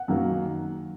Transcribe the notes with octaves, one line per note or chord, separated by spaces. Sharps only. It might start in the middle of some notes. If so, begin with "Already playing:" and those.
Already playing: F#5
F#2 D#3 F#3 A#3